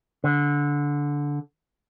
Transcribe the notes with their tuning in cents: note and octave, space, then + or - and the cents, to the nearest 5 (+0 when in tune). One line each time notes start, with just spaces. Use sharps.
D3 -15